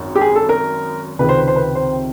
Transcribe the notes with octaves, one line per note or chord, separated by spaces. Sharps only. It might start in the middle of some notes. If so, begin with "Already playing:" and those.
Already playing: G#1 F#2
G4
G#4
A4
A#4
C#2 C3 D#3 B4
C5
B4
C5
B4
C5